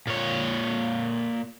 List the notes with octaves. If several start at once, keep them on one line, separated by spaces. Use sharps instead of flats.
A#2 C#5